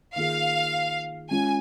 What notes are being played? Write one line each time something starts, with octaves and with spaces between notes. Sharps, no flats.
D#3 A#3 F4 G#4 F5
G#3 C#4 F4 G#5